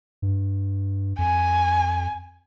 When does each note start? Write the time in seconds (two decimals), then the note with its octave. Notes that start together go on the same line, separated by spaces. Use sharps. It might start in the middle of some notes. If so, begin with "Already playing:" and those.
0.22 G2
1.18 F2 G#5